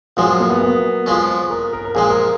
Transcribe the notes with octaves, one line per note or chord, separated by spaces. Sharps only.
A#1 A#2 F3 F#3 G#3
A#3
B3
B3
F2 F3 G#3 C#4
A#4
A#4
A#4
A#1 A#2 G#3 G#4
A#4